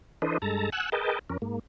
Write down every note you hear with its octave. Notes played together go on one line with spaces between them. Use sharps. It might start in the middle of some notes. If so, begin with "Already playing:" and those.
E3 D4 A4 B4 C5 D#5
G2 G#3 A4 A5 A#5
F#5 G#5 E6 F#6
G#4 A#4 B4 D#5 G5 A5
F2 C#4 A#4
G#2 A#3